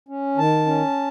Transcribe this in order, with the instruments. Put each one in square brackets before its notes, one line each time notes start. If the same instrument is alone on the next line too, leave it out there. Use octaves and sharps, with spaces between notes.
[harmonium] C#4
D#3 A5
C#4